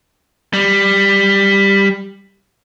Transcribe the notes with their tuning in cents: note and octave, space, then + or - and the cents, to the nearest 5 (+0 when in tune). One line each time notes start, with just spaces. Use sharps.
G3 +10